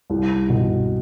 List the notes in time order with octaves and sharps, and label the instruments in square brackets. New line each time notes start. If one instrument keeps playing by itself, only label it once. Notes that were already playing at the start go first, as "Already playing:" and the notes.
[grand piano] C2
B2